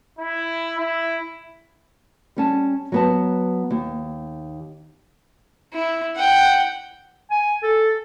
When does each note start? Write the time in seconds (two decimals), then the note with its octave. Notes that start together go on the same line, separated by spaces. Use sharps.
0.19 E4
0.77 E4
2.36 G3 C#4 A5
2.92 F#3 B3 A5
3.71 D#2
5.73 E4
6.16 F#5 G5
7.31 G#5
7.63 A4